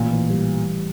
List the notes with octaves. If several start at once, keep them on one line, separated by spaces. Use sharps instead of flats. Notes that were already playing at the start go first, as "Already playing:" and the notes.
Already playing: A1 A#2
E3
G3